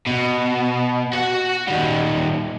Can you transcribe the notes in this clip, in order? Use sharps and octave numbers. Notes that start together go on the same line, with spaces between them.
B2
F#4 F#5
D#3 G3